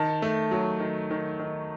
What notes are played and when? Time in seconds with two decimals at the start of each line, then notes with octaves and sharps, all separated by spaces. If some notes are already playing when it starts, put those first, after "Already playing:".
Already playing: D#3 A5
0.22 A3
0.51 F#3
0.80 D#3
1.11 D#3
1.39 D#3